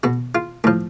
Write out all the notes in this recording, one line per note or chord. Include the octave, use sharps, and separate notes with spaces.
B2 F#4
F4
A2 F3